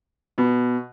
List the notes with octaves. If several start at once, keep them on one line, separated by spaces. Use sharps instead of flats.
B2